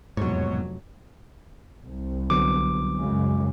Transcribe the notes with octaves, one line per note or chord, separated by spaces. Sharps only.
F1 E2 G#2 B2 F#3 C#5
C2
D3 F#3 B3 D6
F#2 C#3 G#3